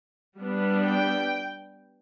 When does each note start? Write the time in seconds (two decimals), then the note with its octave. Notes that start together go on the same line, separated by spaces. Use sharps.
0.38 G3 B3 D4
0.85 G5